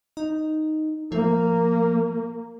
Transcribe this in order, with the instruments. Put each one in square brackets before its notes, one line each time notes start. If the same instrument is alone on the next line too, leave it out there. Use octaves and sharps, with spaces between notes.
[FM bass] D#4
[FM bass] F3 [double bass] A#3